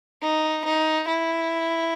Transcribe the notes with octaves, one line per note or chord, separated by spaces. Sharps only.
D#4
D#4
E4